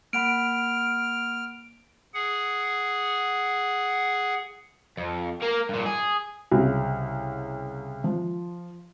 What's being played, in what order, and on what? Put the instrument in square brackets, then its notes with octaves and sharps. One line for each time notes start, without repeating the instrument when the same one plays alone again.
[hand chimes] A#3 F#5 B5 [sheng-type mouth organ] F6 [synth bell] D7
[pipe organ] G#4 F#5
[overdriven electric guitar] F2
A#3 A#4
G2 A#2
G#4
[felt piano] C2 C#3
F3